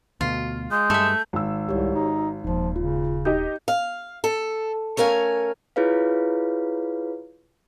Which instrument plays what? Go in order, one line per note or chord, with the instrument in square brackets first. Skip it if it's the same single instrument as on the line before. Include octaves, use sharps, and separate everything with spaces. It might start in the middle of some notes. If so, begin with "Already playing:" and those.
[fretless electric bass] D2 B2 [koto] F4
[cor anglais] G#3 [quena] G6
[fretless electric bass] G2 [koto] A3 E5
[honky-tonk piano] G#1 E6
[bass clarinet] C2 [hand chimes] G4 C#5
[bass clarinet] D#4 [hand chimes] F#4
[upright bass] D#1 B2 [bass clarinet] F3 [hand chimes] D#4
[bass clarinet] C#3 [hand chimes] F4
[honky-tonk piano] D#4 G4 D#5 [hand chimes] G6
[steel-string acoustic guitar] F5
A4
A3 C#4 A#4 F5 G#5
[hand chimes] E4 F4 G#4 B4 C#5 F5